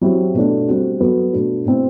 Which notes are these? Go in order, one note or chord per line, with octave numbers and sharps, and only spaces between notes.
F#3 C4 E4 G4
B2 A3 D4
G3 C4 F#4
F#3 B3 F#4 A4
B2 A3 D4 F#4
B2 A3 C4 E4